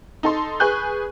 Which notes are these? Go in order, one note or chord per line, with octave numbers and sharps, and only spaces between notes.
D#4 A4 C6
G#4 B4 G#5 C#6 F#6 G6